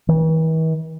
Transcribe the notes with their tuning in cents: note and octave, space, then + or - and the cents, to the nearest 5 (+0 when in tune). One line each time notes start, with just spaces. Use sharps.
E3 -45